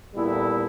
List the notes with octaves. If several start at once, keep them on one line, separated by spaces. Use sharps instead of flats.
A#2 G3 B3 E4 A4